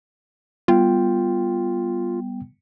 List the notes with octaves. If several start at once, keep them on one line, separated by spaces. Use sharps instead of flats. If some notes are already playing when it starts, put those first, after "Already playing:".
G3 B3 F4 G5